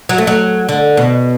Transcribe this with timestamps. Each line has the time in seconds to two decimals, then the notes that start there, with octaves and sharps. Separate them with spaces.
0.09 F#3
0.18 A3
0.27 F#3
0.69 D3
0.97 B2